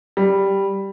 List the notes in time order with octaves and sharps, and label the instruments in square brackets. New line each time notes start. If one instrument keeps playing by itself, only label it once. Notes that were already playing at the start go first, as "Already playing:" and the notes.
[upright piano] G3